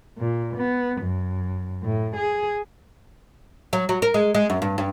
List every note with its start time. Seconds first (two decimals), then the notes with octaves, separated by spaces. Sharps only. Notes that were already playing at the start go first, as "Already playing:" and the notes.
0.19 A#2
0.57 B3
1.02 F#2
1.83 A2
2.16 G#4
3.73 F#3
3.89 F#3
4.02 A#4
4.14 G#3
4.35 G#3
4.50 F#2
4.62 G2
4.78 G2